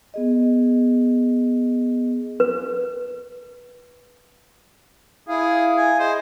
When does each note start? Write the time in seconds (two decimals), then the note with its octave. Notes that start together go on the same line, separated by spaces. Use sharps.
0.14 B3 G#4 D#5
2.40 B4
5.29 E4 G#4 F5
5.78 G#5
6.00 G#4 C5 D#5